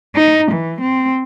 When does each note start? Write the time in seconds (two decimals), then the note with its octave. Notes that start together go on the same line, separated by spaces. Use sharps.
0.15 D#4
0.51 E3
0.81 C4